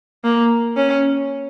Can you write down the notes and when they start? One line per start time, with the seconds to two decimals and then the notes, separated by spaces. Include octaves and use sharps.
0.24 A#3
0.77 C#4